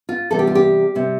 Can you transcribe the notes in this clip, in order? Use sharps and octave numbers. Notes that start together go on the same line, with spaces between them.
F4
E2 C3 G3 A4
G4
F4
G4
C3 G3